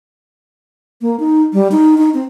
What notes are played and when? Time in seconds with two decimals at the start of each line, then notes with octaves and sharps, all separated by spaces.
1.01 A#3
1.20 D#4
1.53 G3
1.72 D#4
1.98 D#4
2.14 C4